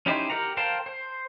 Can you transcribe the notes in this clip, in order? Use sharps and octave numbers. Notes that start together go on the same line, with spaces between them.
C#4 D#4 E4 G4 C5
G4 A#4 F#5 A#5
A#4 C5 F5 G5 A5
C5